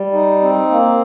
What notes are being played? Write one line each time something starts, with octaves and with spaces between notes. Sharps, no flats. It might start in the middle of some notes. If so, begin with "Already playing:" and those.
Already playing: G3
D#4
C4
A#3